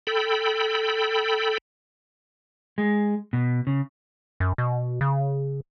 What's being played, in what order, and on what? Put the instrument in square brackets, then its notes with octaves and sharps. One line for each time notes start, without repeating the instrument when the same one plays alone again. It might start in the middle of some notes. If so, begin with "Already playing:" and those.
[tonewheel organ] A4 G5 B5
[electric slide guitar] G#3
B2
C#3
[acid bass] F#2
B2
C#3